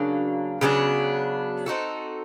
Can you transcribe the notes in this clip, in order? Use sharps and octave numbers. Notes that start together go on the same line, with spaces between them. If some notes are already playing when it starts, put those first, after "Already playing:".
Already playing: C#3 F#3 A#3 D4
C#3 F#3 B3 D4
C4 D#4 F#4 A4